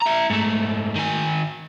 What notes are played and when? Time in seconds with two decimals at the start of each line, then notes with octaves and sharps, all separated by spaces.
0.02 E4 A#5
0.30 G#2 A3
0.95 D#3 G#5